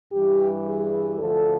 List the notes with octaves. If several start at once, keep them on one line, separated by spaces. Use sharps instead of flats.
G2 E3 G3 G4
G#4
D2 D3 F3 A4